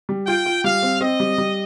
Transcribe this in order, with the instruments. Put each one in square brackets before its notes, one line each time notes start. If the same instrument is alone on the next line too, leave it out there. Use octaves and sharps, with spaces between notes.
[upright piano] G3
[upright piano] F4 [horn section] G5
[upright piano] F4
[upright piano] G3 [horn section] F5
[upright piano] C4
[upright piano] C4 [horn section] D#5
[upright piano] G3
G3